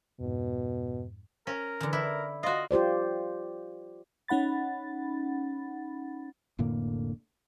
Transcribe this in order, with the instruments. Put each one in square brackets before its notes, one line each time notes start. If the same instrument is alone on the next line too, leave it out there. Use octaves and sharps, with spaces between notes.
[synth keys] F2 G#2 [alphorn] B2
[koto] C#4 [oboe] A#4
[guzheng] D3 E3
[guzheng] D4 [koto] E4 [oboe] A#4
[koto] F4 F#4 [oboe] D#5
[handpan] F4 G4 C5 D5
[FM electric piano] C#4 D#4 F#5 B5 A6
[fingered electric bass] F1 A2 D3 A#3